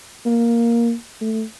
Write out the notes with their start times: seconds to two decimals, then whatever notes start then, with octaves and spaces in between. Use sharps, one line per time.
0.26 A#3
1.21 A3